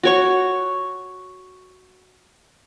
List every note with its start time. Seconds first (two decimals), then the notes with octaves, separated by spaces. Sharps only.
0.03 F#4 C#5 C#6